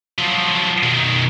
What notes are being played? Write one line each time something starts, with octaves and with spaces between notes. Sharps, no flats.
F3 F#3
B2 D#3